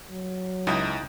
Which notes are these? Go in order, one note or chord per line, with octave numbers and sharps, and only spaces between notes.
F#3
C#2 D#4 E4 G4 C6 D#6